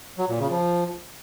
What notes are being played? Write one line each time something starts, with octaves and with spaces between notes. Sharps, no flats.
F#3
A#2
C#3
F3